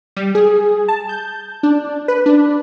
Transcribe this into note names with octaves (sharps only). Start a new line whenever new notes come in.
G3
G#4
A5
G6
D4
B4
D4